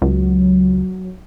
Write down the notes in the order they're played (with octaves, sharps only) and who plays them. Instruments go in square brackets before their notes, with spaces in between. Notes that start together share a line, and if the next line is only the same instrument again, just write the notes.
[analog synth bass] C#2 [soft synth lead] F#3